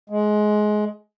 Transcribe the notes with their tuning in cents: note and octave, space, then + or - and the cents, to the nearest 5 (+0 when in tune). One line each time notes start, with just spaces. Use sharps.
G#3 +20